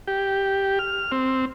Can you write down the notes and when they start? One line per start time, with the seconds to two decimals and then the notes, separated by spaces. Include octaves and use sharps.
0.07 G4
0.79 F6
1.12 C4